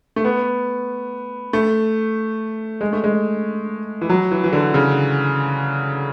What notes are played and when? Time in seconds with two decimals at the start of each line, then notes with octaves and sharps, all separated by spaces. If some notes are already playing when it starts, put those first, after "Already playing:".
0.16 A3
0.24 B3
1.53 A3
2.81 G#3
2.93 A3
3.04 G#3
4.01 E3
4.09 F#3
4.31 E3
4.44 E3
4.53 D3
4.74 C#3